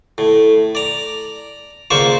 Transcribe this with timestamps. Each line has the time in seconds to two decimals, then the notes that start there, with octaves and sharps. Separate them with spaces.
0.18 A2
0.75 D5 A#5
1.90 C#2 A#3 C5 D5 C#6